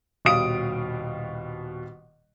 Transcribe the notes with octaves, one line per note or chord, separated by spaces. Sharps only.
D#1 B2 G3 F5 D#6 D7